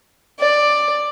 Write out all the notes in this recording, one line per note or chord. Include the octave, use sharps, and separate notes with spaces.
D5